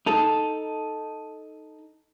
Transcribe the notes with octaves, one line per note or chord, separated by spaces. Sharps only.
D#4 A4